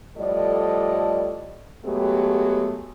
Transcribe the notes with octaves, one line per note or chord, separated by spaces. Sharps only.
A2 F3 G3 A4 D5 D#5
F#3 G#3 A3 B3 G4